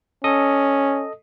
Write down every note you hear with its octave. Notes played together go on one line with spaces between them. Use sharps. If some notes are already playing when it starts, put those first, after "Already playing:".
C#4 A4 D#5 D#6